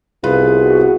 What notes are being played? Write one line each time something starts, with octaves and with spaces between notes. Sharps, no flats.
C2 B3 F4 G#4 B4
F#4